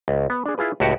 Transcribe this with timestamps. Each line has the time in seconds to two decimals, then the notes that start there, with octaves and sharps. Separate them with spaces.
0.08 C#2
0.30 B3
0.46 D4 G#4
0.58 E4 F4 G#4 B4
0.80 C#2 A2 F#4 G4 F#5